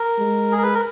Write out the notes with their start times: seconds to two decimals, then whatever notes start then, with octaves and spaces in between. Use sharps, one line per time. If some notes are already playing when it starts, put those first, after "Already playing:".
Already playing: A#4
0.19 G#3
0.52 G#4
0.58 A#4
0.63 B4
0.74 A#4